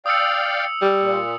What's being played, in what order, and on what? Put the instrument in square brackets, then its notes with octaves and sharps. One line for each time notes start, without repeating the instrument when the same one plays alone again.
[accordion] D5 F5 G5 [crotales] D#6 E6 C#7
[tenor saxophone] G3
[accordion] A#2